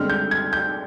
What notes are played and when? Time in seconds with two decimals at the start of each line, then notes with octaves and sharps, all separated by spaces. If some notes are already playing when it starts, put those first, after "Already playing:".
Already playing: G2 D3 G#3 C4 F6
0.09 G6
0.31 G#6
0.53 G6